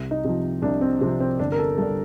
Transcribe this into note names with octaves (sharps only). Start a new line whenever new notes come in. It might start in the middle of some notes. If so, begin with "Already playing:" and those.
Already playing: C2
D#4
C3 F3
C2 D4
C4
C3 F3 C4
C4
G1 D4
A#4
A4
G2 D3 A4